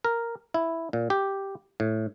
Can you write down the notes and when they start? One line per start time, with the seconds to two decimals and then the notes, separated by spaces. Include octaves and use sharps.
0.04 A#4
0.54 E4
0.93 A#2
1.10 G4
1.80 A2